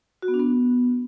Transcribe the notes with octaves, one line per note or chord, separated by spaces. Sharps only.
F#4
B3
D4
B3